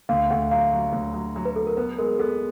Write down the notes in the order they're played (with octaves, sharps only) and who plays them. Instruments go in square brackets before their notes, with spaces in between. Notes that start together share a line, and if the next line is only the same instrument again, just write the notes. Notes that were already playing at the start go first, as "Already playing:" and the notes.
[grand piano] D2 [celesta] F5
[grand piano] D2 [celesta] F#5
[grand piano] F#3 [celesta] F5
[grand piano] F#3
D2
F#3
F#3
[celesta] B4
[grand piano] F#3 [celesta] A4
[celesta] A#4
[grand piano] B3 [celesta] B4
[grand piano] G#3 [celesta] A#4
[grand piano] B3 [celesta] A4